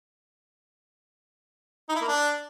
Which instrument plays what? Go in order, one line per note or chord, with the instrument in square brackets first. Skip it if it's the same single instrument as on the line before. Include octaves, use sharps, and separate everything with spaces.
[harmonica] D#4
E4
A#3
D4